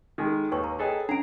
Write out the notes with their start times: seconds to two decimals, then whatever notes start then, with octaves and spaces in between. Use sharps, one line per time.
0.18 D#3 G#3 A4
0.52 D#2 B4 C#5 C#6
0.64 A#5
0.79 G#4 A4 B4 C#5 D#5 G5
1.09 C#4 D4 A#5 C7 D7